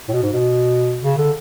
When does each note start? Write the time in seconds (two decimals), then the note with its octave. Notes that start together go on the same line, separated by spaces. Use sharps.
0.09 A2
0.13 B2
0.23 G#2
0.34 B2
1.03 C#3
1.18 D3